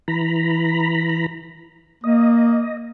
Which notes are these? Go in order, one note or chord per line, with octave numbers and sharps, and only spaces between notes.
E3 A#5 B5
A#3 D#5